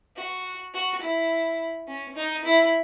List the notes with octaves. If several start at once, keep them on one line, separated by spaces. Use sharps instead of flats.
F#4
F#4
E4
C#4
D#4
E4